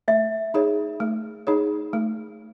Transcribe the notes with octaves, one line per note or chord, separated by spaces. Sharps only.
A3 E5
D#4 G#4 C#5
A3
D#4 G#4 C#5
A3